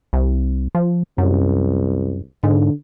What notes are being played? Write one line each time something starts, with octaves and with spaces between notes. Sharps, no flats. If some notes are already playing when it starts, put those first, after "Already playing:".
C2
F3
C2 F#2
G#2 D3